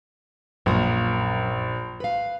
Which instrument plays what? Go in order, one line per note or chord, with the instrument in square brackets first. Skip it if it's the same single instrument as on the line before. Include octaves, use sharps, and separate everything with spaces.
[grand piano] A#1 [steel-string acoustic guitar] F#2 A#3 A#5
[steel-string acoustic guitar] B4 F5